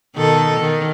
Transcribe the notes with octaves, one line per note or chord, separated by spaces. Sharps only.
B2 D#3 A4
D#3